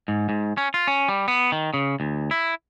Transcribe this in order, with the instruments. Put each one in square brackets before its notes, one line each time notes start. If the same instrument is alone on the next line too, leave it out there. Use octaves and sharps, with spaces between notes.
[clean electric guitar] G#2
G#2
C#4
F4
C#4
G3
B3
D#3
C#3
D2
E4